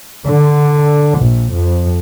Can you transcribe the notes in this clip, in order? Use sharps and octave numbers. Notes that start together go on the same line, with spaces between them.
D3
A#1
F2